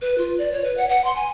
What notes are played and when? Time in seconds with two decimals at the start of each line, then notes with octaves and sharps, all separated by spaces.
0.02 B4
0.18 F4
0.38 D5
0.52 C#5
0.64 B4
0.77 F#5
0.89 F#5
1.05 C6
1.16 G#5